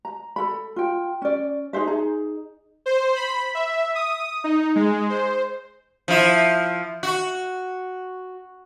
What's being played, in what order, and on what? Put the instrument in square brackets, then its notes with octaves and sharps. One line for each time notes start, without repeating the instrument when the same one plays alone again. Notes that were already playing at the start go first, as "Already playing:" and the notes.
[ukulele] A#5
A4 B5
F4 G5
C#4 D5
D#4 G#4 C5 E5
D#4 G#4 A#5
[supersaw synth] C5
B5
E5
D#6
D#4
G#3
C5
[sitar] F3 E4
F#4